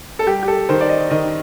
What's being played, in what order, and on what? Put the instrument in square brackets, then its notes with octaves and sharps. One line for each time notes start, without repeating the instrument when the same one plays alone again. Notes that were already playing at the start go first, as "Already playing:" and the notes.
[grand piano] A4
[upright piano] G3 [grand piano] G4
[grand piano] G4
A4
[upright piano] D#3 [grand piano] C5
[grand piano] D5
D#5
[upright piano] D#3 [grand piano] D#5